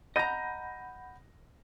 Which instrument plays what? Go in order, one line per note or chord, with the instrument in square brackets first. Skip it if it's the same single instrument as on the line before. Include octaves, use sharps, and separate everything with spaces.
[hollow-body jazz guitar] D#5 A#5 [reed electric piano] F#5 B5 G6 [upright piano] A#6 D#7